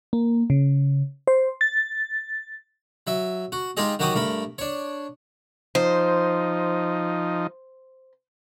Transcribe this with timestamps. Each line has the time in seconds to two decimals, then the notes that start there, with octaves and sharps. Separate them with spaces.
0.13 A#3
0.50 C#3
1.27 C5
1.61 A6
3.07 F#3 E5
3.52 F#4
3.77 G#3 D#4 F4 G4 G#4 D#5
3.99 D#3 F#3 F#4 G4 D6 D#6
4.15 G2 A3 A#4 B5
4.58 D4 C#5
5.75 F3 D#4 C5